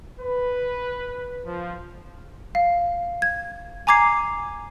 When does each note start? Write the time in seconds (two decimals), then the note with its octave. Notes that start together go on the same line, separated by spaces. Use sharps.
0.20 B4
1.44 F3
2.55 F5
3.22 G#6
3.87 G#5 A#5 D6 G#6 C7